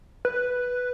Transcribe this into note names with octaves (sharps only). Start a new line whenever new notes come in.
B4